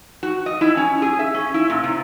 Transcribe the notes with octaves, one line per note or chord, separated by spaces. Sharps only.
F#4
D#5
E4
C#4
G#4
E5
C#4
E4
A#2
C3